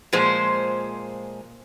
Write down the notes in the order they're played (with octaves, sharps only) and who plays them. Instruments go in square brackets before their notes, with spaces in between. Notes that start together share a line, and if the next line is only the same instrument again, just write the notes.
[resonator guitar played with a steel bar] A#2 F3 G#3 C5